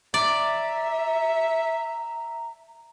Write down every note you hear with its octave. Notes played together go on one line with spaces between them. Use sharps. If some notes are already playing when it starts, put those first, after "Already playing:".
D5 E5 A#5